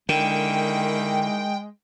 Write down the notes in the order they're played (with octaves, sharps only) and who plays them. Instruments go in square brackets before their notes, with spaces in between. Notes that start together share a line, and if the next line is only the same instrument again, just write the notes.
[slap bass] D3 [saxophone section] D#3 A#3 E4 [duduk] G#3 [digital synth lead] G5